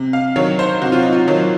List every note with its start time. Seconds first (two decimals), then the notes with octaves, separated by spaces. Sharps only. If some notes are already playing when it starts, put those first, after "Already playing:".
Already playing: C3
0.13 F5
0.36 D#3 F#3 C#5
0.59 C5
0.82 C3 F#4
0.92 F4
1.03 D#4
1.12 F4
1.28 D#3 F#3